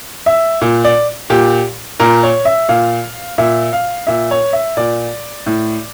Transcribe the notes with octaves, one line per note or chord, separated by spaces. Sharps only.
E5
A#2
D5
A#2 G4
A#2 A#4
C#5
E5
A#2 F5
A#2 E5
F5
A#2 E5
C#5
E5
A#2 D5
A2